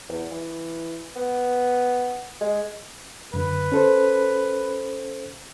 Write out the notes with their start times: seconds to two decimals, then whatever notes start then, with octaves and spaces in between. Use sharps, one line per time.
0.09 E2
0.31 E3
1.16 B3
2.41 G#3
3.34 F#2 D3 B4
3.72 C#4 A4 C5